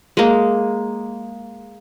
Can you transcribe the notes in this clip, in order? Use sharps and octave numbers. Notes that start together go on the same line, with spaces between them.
G#3 A#3